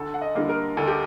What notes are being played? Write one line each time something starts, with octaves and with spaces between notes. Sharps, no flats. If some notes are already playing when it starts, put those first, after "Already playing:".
Already playing: D2 A4
F#5
D#5
D3 G3 A#3
A#4
D2 A4
G4